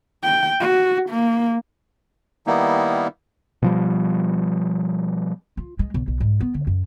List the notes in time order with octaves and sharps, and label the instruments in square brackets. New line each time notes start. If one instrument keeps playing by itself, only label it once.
[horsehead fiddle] G5
F#4
A#3
[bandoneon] D#3 G3 A#3 B3 D#4 E4
[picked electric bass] B2 F3 G3
[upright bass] F4
G#3
B1
B1
G#2
B3
D3
F#2